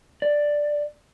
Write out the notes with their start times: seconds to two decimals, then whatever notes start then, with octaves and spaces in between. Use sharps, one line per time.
0.22 D5